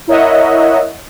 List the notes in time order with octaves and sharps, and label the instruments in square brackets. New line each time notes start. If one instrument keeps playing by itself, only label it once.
[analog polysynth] E4 A#4 C#5 D#5 E5 F#5